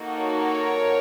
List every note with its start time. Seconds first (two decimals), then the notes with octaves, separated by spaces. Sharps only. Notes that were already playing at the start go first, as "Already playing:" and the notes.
Already playing: A#3 D#4 F#4 A4
0.19 A#4 C#5